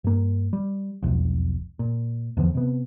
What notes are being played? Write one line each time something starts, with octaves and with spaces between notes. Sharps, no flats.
G2 A#3
G3
E1 B1 F2
A#2
E2 D3 E3 F3
C3 B3